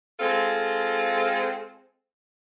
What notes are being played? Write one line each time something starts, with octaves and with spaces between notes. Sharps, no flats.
G#3 C4 F4 A4